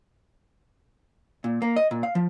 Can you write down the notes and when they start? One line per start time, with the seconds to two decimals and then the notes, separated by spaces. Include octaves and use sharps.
1.44 A#2
1.62 A#3
1.76 D#5
1.91 A#2
2.03 F5
2.15 F3